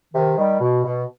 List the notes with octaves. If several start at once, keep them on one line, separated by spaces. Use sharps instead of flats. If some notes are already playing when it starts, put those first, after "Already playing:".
C3 D#3
D#3 G3
B2
B2